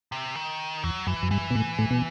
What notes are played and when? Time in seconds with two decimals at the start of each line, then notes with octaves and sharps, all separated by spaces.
0.12 C3
0.35 D#3
0.83 E2 F#3
1.07 F#2 E3
1.23 F#2
1.31 G2 E3
1.50 B2
1.55 A2
1.79 A2
1.91 B2